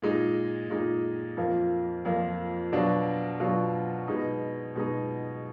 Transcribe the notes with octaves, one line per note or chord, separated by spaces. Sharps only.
A#2 G#3 D#4
A#2 G#3 D#4
F2 F3 A#3
F2 F3 A#3
B2 F#3 D4 F4
B2 F#3 D4 F4
B2 G#3 D#4
B2 G#3 D#4